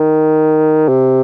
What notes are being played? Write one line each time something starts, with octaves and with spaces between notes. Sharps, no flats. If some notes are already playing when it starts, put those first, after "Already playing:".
Already playing: D#3
C3